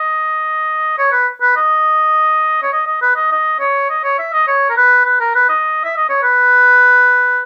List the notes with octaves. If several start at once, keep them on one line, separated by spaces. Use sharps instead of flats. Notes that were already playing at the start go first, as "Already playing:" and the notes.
Already playing: D#5
C#5
B4
B4
D#5
C#5
D#5
D#5
B4
D#5
D#5
C#5
D#5
C#5
E5
D#5
C#5
A#4
B4
B4
A#4
B4
D#5
E5
D#5
C#5
B4